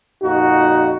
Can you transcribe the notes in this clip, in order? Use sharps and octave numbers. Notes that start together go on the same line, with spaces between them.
F2 A#2 D#4 F#4